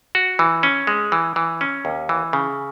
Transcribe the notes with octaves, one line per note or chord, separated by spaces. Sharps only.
F#4
E3
C#4
G#3
E3
E3
C#4
D#2
E3
C#3